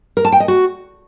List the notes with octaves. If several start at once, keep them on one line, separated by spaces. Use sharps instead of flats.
A#4
A5
G5
D#5
F#4